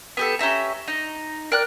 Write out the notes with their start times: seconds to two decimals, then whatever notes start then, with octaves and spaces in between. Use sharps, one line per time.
0.17 B3 G4 A4
0.39 C#4 G4 E5 A#5
0.87 D#4
1.52 A#4 D5 G5 F#6